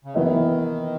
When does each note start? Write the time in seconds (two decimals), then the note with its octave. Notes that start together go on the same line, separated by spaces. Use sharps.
0.05 C#3
0.14 D#3 E3 B3 E4 A#4 D#5